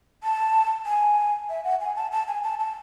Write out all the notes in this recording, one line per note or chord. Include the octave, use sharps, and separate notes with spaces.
A5
G#5
E5
F#5
G#5
A5
A5
G#5
A5
A5